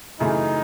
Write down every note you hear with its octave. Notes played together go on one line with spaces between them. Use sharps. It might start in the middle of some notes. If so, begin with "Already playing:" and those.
F#2 C#3 E3 A3 D#4